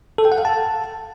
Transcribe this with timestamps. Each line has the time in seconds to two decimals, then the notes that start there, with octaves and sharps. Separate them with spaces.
0.18 A4
0.25 G5
0.32 F#5
0.38 F5
0.45 A5